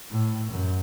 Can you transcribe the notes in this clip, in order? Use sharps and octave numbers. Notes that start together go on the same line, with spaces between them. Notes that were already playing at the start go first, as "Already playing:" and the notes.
A2
F#2